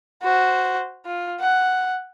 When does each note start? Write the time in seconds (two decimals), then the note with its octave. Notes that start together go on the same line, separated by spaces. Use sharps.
0.23 F#4 C5
1.05 F4
1.40 F#5